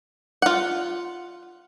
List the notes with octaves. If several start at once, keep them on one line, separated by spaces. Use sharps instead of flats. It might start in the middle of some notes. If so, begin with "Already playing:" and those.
F4 F#5